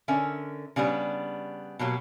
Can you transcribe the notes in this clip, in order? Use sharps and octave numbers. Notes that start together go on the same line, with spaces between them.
D3 C#4 A#4 E5
C#3 G3 B3 D4
B2 F#3 A#3 G4